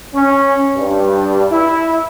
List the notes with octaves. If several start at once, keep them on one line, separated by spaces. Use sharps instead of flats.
C#4
G2
E4